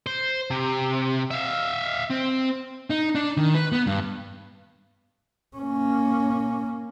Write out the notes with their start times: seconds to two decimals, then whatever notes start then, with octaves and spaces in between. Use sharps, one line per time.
0.07 C5
0.51 C3
1.31 E5 F5
2.10 C4
2.90 D#4
3.15 D4
3.38 D#3
3.55 B4
3.72 B3
3.87 G2
5.57 A#3 C#4